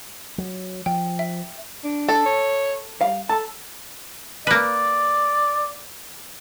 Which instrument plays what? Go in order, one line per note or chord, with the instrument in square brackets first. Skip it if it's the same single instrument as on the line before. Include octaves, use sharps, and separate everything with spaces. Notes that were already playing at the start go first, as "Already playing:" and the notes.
[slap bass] F#3
[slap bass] F3 [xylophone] G5
[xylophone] E5
[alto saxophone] D4
[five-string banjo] A4
[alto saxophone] C#5
[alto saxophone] G3 [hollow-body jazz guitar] F5
[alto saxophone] A4 [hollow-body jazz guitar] A5
[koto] A#3 B4 [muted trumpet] D5